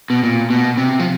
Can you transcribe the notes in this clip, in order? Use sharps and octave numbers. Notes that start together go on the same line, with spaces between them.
B2
A#2
B2
C3
F3